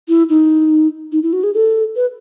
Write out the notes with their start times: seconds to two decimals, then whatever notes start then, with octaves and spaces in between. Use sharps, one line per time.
0.09 E4
0.29 D#4
1.12 D#4
1.23 E4
1.33 F#4
1.44 G#4
1.54 A4
1.96 B4